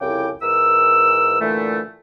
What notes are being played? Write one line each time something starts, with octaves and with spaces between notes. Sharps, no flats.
C2 F2 C#3 E4 G5 D6
G#2 E3 A#4 E6
A#2 D3 E3 A3